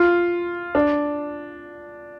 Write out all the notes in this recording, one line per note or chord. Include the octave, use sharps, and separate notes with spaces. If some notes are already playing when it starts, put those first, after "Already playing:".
Already playing: F4
D4